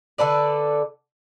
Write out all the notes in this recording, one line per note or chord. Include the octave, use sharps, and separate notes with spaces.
D3 A4 B4 D5